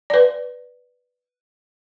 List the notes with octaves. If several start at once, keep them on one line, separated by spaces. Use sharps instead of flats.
B4 D5